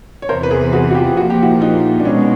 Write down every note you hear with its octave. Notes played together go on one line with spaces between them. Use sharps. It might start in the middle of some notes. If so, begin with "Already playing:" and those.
C#5
E2 C3 E3 A#4 C5
B4
G#4 A#4
F#4 G#4
F#4
F4 G4
A#2 F3 A#3 F#4
G4
E4 F#4
D#4 F4
D4
B2 G#3 C#4 D#4